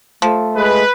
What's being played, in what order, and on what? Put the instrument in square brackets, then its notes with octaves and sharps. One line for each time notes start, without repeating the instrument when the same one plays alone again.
[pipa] F3 [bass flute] A3
[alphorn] G#3 [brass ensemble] B4